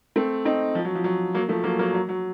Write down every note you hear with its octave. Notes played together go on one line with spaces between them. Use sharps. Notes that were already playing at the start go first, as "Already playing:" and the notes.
A3 C4
C4 D#4
F3
F#3
F3
F#3
F#3 A#3
F3 A3
F#3 A#3
F#3 A#3
F#3
F#3